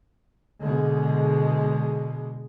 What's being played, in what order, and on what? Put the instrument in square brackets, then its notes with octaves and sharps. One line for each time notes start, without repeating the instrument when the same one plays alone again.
[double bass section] B2 D3 G#3